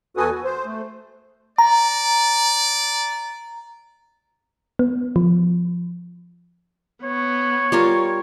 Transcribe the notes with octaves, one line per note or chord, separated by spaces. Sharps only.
E2 F#4 A4 B4 G#5 D#6
F#4
C5
A3
D5 A#5
B3
F3
B3 C#5
G3 F4 A#4